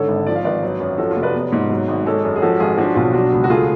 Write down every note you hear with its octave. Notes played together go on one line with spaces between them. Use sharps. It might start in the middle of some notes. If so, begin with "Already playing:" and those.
Already playing: G#2 D3 A4 C#5
G#1
F3 D5
F5
G#1 B4 D5
F#3
F#2
F3 F#4 A4
F4
F1
B4 D5
B3
G#2
F#3
G#1
G#3 A4 C#5
F#2
G#4
F3 F#4 A4
G#1 F4 G#4
F3 D4 F#4
B1 F4
F#3 D4 F#4
C#2
F#4
A3 F4 G#4